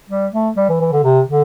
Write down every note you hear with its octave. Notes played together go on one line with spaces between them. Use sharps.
G3
A3
G3
E3
E3
D3
C3
D3